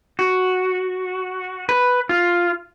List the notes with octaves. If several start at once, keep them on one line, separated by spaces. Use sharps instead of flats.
F#4
B4
F4